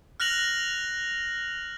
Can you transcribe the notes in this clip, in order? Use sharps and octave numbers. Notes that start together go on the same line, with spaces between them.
F6 F#6 A#6 F7 F#7